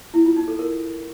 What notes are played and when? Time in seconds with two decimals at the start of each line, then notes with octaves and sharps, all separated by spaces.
0.14 E4
0.25 F4
0.36 D#4
0.48 A4
0.59 A#4